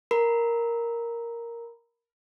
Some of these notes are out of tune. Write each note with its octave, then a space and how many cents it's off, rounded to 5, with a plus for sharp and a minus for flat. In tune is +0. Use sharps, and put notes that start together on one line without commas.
A#4 +0 B5 +0